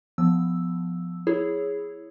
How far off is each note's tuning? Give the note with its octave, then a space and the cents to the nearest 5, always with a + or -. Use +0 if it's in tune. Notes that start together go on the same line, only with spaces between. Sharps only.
F3 +10 B3 +15 E6 +0
E4 +0 G#4 +0 C#5 +0